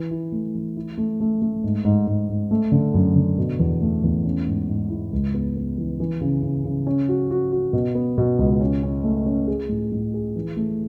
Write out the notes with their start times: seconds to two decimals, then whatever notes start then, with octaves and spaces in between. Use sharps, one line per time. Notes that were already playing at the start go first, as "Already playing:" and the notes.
Already playing: E3
0.11 E4
0.32 A3
0.55 E3
0.77 E4
0.98 A3
1.20 A3
1.42 A3
1.64 G#2
1.85 G#2
2.07 G#2
2.29 G#2
2.51 A3
2.72 D3
2.94 F#2
3.16 D3
3.38 B2
3.59 E2
3.81 A3
4.04 E2
4.25 C#4
4.46 G#2
4.68 G#2
4.90 E4
5.13 C#2
5.34 B3
5.56 B3
5.78 E3
6.00 E3
6.21 C#3
6.42 C#3
6.65 C#3
6.87 C#4
7.08 F#4
7.31 F#4
7.52 F#4
7.73 B2
7.95 B3
8.18 B2
8.39 C#2
8.61 C#4
8.83 C#4
9.04 A3
9.26 C#4
9.47 G#4
9.69 A2
9.92 A2
10.14 G#4
10.36 E3
10.57 A3